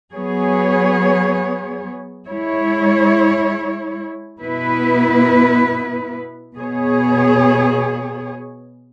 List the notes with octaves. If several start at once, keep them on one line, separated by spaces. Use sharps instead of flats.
F#3 B3 G#4 C#5
G#3 E4 C#5
B2 B3 E4 B4
B2 B3 G#4 C#5